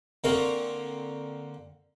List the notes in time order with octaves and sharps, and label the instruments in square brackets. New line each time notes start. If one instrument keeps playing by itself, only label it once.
[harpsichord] D3 A#3 C4 A#4 C#5